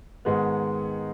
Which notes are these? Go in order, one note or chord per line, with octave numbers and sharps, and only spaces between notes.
G#2 D#3 G#3 B3